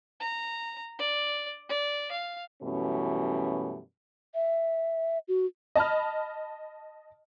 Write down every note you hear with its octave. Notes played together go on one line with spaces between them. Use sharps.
A#5
D5
D5
F5
F#2 B2 E3 G3 A3 C#4
E5
F#4
D#5 A5 B5 F6